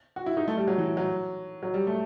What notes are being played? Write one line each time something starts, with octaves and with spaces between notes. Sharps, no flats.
F#4
E4
D#4
A3
G3
F#3
E3
F#3
F#3
G3
A3